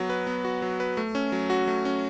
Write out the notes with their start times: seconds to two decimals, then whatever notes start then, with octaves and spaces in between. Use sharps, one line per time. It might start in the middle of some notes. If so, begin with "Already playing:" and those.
Already playing: F#3 B3 F#4
0.09 B4
0.27 B3
0.45 F#4
0.62 F#3
0.80 B4
0.97 A3
1.15 C#4
1.32 F#3
1.50 F#4
1.67 A3
1.85 C#4